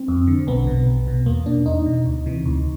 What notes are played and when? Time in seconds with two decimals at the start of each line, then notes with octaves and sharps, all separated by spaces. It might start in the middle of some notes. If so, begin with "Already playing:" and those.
Already playing: C4
0.08 F2
0.28 D3
0.47 B1 B3
0.67 B2
0.87 B1
1.08 B2
1.26 E2 A#3
1.46 B2 D4
1.66 E2 D#4
1.86 B2
2.06 D2
2.26 C3 E3
2.46 D2